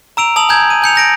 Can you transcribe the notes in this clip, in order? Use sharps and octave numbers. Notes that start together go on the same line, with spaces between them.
A#5 E6 D7 F7
A5 D#6 E6 F7 F#7
G#5 A#5 G6 G#6
D#7
G#5 G6 C#7 F7
G6 A#6 D7